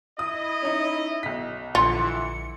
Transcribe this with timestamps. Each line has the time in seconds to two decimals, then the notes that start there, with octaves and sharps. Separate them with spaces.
0.19 E4 D#5 D#6
0.62 C#4 D#4
1.23 B1 B6
1.75 A#1 D3 E3 F4 C#7